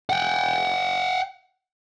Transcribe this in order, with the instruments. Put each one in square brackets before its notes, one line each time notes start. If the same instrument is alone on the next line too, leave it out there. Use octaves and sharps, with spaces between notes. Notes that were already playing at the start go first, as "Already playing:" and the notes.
[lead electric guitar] F#5 G5